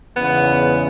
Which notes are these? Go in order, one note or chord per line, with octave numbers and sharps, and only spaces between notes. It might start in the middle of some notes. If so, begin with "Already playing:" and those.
E2 G#2 C#3 B3